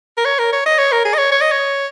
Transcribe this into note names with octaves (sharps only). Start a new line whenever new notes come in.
A#4
C#5
A#4
C#5
D#5
C#5
A#4
G#4
D#5
C#5
C#5
D#5
C#5